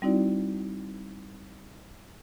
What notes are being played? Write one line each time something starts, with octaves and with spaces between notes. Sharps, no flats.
G3 C4 D#4 E4 F#4 D5